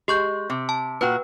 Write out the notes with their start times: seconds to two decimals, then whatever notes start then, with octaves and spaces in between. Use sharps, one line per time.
0.08 G#3 G4 C#6 G6
0.50 C3
0.69 A5
1.01 A#2 F#4 B4 G5